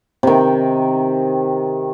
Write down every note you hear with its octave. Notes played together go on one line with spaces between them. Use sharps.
C3 D#3